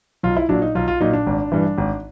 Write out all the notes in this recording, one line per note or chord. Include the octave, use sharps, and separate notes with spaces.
B1 F4
E4
A#2 F#3 D4
D#4
B1 F4
F4
A#2 F#3 D#4
D4
G#1
G2 E3
G#1